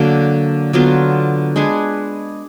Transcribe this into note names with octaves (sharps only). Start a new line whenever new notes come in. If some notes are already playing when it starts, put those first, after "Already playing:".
Already playing: D3 F#3 A#3
D3 F#3 B3 F4
G#3 D4 G#4 B4